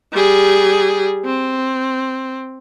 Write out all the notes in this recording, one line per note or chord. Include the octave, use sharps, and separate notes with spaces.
G3 G#4
C4